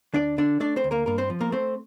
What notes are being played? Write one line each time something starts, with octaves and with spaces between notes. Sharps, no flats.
D2 D4 D5
D3 D4 D5
A3 D4 D5
C4 C5
D2
A#3 A#4
G2 A#3 A#4
C4 C5
F3
A#3 A#4
A3 C4 C5